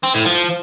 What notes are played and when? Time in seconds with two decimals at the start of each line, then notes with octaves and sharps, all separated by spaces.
0.04 C4
0.15 A2
0.26 F3